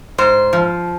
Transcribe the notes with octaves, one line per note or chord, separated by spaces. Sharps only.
G#2 C5
F3